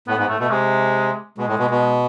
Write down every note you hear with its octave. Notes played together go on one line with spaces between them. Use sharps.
A2 B3
G#2 B3
A2 A3
B2 A3
C3 G#3
B2 G#3
A2
B2
B2